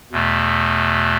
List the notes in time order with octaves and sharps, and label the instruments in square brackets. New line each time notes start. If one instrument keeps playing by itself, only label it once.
[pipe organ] E2 B2 A3